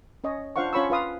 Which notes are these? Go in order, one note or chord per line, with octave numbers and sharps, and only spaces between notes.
C#4 C#5 D#5
D4 F4 C5 F5 F#5 C#6
C#4 F4 C#5 B5 C#6 E6
F4 B4 F5 D#6